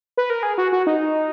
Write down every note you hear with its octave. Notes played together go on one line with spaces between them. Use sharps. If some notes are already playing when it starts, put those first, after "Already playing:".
B4
A#4
G#4
F#4
F#4
D#4